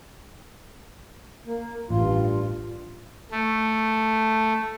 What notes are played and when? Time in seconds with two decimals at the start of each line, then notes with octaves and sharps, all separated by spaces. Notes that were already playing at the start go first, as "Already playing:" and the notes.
1.47 A#3
1.90 A1 G2 F4
3.31 A3